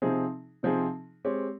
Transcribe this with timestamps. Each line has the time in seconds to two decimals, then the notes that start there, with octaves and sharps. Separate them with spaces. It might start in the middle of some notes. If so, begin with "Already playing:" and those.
0.02 C3 F3 C4 D#4 G#4
0.63 C3 F3 C4 D#4 G#4
1.25 G#3 C4 G4 C#5